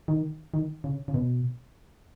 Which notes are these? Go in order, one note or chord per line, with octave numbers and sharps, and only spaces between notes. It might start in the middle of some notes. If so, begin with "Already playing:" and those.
D#3
D#3
C#3
C#3
B2